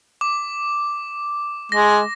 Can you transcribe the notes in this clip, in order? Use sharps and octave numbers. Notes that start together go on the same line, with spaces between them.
D6
G#3 A#6